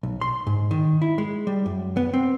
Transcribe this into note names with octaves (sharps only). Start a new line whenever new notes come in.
B1
C6
G#2
D#3
E4
G#3
G3
F#2
B3
C4